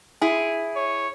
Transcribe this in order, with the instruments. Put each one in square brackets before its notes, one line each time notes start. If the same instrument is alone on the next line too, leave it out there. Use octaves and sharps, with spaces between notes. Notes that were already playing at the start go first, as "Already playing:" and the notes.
[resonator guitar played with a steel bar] E4 G#4
[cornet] C#5